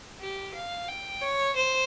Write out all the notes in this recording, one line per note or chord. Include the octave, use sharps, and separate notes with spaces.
G4
F5
G5
C#5
C5